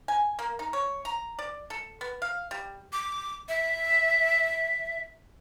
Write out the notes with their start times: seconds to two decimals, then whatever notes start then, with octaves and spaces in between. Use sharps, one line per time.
0.08 G#5
0.39 A#3
0.59 D#4
0.73 C#5
1.05 A#5
1.39 D5
1.70 A4
2.01 B3
2.22 F5
2.51 G3
2.93 D6
3.49 E5